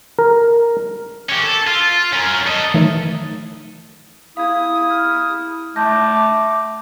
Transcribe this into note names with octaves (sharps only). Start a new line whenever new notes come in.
A#4
C#4 G4
A4
F4
C#4 A#4
A4 D#5
D#3 E3 F#3 A3 D#4
E4 F5 D#6 G#6
F6
A3 A5 D6 G6 A#6